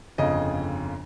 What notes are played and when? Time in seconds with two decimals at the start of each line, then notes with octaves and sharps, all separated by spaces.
0.18 G1 F2 C#3 D#5